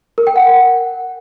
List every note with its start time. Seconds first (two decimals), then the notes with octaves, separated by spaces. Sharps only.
0.18 A#4
0.27 G5
0.36 F#5